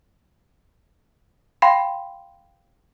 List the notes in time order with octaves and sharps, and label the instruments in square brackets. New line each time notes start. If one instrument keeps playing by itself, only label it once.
[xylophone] F5 G5 B5 C6